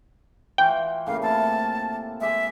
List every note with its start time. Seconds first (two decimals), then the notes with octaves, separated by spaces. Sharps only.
0.58 E3 F4 F#4 G5
1.07 A2 C#3 A#3 F5
1.23 C3 E4 F5 A5
2.21 G#3 G4 E5 G#5